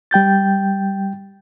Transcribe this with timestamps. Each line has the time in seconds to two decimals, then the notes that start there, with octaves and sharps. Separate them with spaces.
0.11 G3 G5 G6 A6